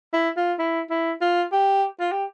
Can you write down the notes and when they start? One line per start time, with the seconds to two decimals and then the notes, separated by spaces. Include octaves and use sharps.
0.13 E4
0.37 F4
0.59 E4
0.90 E4
1.21 F4
1.52 G4
2.00 F4
2.12 G4